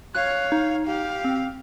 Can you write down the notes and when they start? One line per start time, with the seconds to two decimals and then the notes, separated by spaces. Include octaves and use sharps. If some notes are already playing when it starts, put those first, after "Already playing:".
0.15 C#5 F5 F#6
0.52 D#4
0.85 G4 F5
1.25 C4